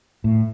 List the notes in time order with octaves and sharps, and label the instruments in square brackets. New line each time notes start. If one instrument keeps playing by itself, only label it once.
[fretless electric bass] A2